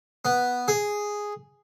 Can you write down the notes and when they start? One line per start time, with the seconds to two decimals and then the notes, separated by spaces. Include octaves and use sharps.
0.25 B3
0.68 G#4